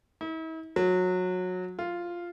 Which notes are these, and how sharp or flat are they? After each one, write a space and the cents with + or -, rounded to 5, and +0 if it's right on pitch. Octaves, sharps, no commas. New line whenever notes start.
E4 -45
F#3 -20
F4 -5